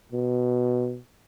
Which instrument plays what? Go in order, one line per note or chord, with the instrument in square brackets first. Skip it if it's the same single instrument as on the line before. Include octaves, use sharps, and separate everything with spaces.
[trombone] B2